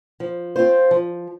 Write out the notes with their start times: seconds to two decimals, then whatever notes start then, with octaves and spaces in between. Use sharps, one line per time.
0.20 F3
0.56 C4 F4 C5
0.91 F3